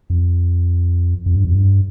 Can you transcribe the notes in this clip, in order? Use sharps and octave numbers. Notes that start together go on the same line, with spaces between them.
F2
F2
G2
F2
G2